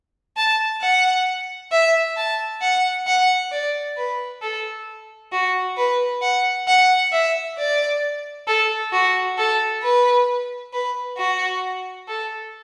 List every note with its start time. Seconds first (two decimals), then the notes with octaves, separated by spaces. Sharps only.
0.37 A5
0.81 F#5
1.72 E5
2.17 A5
2.62 F#5
3.07 F#5
3.52 D5
3.97 B4
4.42 A4
5.32 F#4
5.77 B4
6.22 F#5
6.67 F#5
7.12 E5
7.58 D5
8.48 A4
8.92 F#4
9.38 A4
9.82 B4
10.73 B4
11.17 F#4
12.08 A4